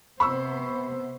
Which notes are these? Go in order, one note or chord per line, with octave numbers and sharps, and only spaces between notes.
C3 B3 C5 B5 C#6 E6